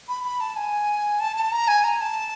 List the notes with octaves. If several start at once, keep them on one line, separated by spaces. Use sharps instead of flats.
B5
B5
A5
G#5
A5
A5
A#5
G#5
A#5
A5